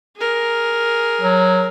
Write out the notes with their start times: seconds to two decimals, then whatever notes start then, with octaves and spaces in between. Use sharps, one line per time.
0.17 G#4 A#4
1.21 F#3